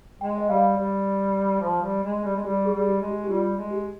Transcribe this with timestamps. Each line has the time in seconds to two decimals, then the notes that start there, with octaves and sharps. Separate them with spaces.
0.21 G#3 G5
0.38 D#5
0.49 G3 F5
0.76 G3 D5
1.61 F3
1.82 G3
2.03 G#3
2.24 G3
2.35 G#3
2.45 G3 G4
2.65 G#4
2.73 G3
2.87 G4
3.01 G#3
3.08 G4
3.24 G4
3.29 G3 F4
3.57 G#3
3.71 G4